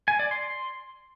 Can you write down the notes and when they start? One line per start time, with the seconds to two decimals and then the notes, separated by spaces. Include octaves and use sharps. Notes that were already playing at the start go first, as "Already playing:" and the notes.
0.08 G#5
0.19 D5
0.31 C6